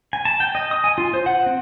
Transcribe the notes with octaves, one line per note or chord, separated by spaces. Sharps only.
G#5
A5
G5
D#5
D#6
G#5
F4
C5
F#5
C4